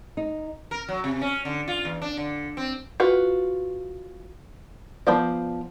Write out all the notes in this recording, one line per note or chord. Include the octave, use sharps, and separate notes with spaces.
D#4
A#4
F#3
C3
C#4
D3
F4
E2
D4
D3
C4
F4 F#4 B4
F3 B3 C5 D5